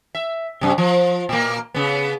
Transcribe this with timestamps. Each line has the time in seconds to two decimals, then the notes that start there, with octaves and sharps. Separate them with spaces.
0.15 E5
0.61 F#2 C3
0.78 F3
1.29 A#2 A#3
1.74 C#3 B3